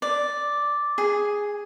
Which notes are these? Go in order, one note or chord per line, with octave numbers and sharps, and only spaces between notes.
D5
G#4